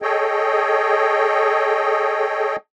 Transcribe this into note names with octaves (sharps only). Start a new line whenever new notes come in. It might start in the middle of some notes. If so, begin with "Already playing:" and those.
G#4 A4 C#5 D#5 G5